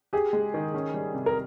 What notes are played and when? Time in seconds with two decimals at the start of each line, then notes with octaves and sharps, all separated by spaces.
0.13 G4 G#4
0.33 G#3
0.54 D#3
0.74 C#4
0.94 G3
1.14 C3
1.26 A#4